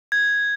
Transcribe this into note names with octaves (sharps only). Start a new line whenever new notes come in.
G#6